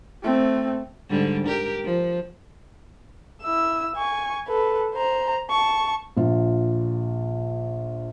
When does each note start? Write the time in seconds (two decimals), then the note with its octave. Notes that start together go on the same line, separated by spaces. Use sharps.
0.23 A3 C4
1.10 G#2 D3 G3
1.47 G4 A#4
1.84 F3
3.42 E4 E6
3.96 G#5 C#6
4.48 A4 B4
4.94 C5 A#5
5.50 A5 C#6
6.17 A#1 F4